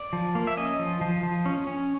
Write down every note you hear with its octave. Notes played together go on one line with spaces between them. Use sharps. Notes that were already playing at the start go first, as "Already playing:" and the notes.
Already playing: D5
F3
A#3
E5
C#4 D#5
F3
F3
F3
C#4
C#4